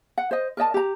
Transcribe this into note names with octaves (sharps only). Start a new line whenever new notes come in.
F#5
C5 D#5
A#4 D5 D#5 A5
G4 A#5